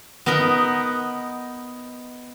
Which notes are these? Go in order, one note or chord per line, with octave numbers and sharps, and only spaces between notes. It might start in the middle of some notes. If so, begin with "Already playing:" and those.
B3 D#4 A#4 B4